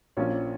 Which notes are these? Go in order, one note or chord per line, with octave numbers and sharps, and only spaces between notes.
A#1 A#2 F3 A#3 C#4 C#5